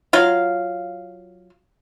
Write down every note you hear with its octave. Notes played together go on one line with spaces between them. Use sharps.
F#3 F4 F5